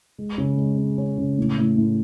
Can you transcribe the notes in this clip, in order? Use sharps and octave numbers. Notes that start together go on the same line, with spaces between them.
G#3
C#3
G#3
C#4
C#4
C#3
A2
A2
A2